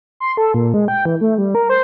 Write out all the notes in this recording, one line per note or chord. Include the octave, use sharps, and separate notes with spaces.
C6
A4
A#2
G#3
G5
E3
A3
G3
A#4
C5